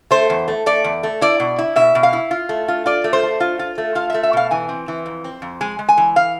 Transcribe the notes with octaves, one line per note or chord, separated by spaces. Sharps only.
A3 C5
E2
A3
A3 D5
E2
A3
E4 D5
B2
E4
B2 E5
B2
F5
E4
F4
A3
F4
F4 D5
A3
C5
A3
F4
F4
A3
F4 F5
E5
A3
E5
B2 F5
E3 G#5
C4
E3
F2
C4
F2
G#3 G#5
G#3
G#5
E3
F5